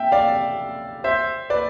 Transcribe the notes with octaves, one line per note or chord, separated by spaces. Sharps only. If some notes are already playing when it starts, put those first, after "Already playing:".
Already playing: E5 G5
D5 F5
C5 E5
B4 D5